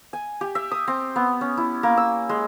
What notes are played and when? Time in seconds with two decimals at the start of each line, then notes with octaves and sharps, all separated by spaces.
0.13 G#5
0.41 G4
0.55 E5
0.71 D#6
0.88 C4
1.16 B3
1.41 C#4
1.58 E4
1.83 A#3
1.97 E6
2.29 G#3